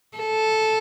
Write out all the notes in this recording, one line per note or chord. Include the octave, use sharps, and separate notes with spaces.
A4